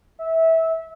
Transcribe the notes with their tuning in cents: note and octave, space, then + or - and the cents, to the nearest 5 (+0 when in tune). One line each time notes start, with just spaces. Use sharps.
E5 -20